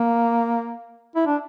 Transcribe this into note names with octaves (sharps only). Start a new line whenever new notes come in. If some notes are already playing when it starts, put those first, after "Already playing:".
Already playing: A#3
E4
D4